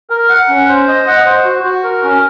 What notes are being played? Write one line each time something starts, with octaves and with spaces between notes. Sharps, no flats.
A#4
F#5
C#4
C5
D#5
F#5
C5
F#4
F#4
A#4
C#4